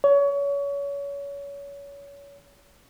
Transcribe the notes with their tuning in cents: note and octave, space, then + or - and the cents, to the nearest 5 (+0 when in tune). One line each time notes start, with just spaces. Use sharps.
C#5 +30